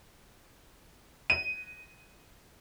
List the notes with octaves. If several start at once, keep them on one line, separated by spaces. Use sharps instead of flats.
D#7